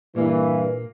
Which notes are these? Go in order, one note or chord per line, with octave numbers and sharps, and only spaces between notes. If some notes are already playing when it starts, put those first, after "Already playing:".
G2 A#2 E3 A#3